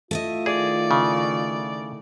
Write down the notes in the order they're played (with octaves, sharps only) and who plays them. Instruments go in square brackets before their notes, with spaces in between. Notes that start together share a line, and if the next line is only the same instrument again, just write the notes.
[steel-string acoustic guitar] A3 E4 D#5 [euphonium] F4
[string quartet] D#3 D5 [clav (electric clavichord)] G#4
[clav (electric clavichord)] C#3